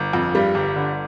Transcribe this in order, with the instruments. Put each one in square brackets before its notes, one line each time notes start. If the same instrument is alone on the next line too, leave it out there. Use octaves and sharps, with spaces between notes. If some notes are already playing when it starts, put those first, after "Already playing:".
Already playing: [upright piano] G1
F2
G2 G3
G1
D3